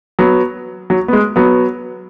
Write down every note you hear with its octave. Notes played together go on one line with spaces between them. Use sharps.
F#3 B3
F#3
B3
G#3
F#3 B3